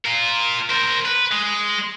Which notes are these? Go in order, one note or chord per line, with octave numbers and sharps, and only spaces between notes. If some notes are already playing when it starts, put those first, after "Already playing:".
F4 A#4
A#4 C5
B4
G#3